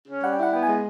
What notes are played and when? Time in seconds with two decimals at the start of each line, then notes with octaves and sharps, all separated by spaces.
0.08 C#4
0.23 G3 F#5
0.33 G5
0.38 E4 F#5
0.53 B3 G5
0.63 G#5
0.68 G#3